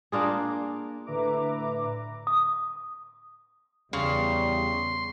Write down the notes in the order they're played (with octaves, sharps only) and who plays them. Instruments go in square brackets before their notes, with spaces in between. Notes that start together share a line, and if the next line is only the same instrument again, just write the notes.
[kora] A#3 D4 F4 G#4
[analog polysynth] A2 D3 B4 E5 A#5 D6
[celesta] D#6
[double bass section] E2 [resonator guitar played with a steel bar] C#3 [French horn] G3 [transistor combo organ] C6